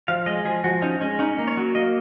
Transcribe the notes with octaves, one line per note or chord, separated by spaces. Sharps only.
F3 F5
G#3 D#5
F3 G#4
F3 F#4
C#4 D#4
G#3 C#4
C#4 D#4
A#3
C#5
F#3
A#3 D#5